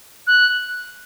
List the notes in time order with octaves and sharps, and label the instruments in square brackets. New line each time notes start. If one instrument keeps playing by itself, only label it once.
[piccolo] F#6